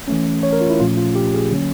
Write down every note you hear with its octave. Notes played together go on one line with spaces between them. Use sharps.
E3 A3 C#4
C#5
A#4
F4
E4
A#2 F3 A3 C#4 F4
F4
G4
G#4
D3 F#3 A#3 C#4